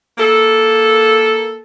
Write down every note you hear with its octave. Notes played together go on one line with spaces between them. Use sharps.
A#3 A4